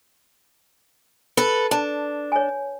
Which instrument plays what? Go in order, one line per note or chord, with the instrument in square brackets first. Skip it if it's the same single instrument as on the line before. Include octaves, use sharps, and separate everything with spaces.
[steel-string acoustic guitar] A4 B4
[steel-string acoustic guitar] D4 [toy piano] A5
[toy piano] C#5 G#5